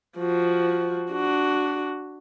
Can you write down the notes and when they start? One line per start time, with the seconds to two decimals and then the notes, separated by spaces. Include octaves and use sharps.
0.18 F3 F#4
1.11 D4 F#4